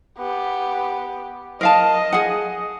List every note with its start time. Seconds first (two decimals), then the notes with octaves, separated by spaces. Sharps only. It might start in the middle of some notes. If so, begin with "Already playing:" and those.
0.19 B3 G4
1.61 A#4 D#5 F5 A5
2.13 G#4 F#5